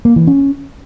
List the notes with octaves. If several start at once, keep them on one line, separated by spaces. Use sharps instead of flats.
A#3
E3
C#4